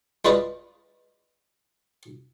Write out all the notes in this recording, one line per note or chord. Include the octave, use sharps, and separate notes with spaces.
G#3 F4 B4 D5 D#5